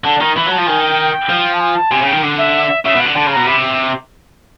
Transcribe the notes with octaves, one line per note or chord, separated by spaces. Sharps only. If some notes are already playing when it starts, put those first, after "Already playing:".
D3 A5
D#3 A#5
E3 B5
F#3 A5
F3
D#3 G#5
G5
F3
A5
G#5
A5
C3 G#5
C#3
G5
D#3
D3
E5
C#3 E5
B2
F#5
D3
D3 A5
C#3
B2 A#5
C3 B5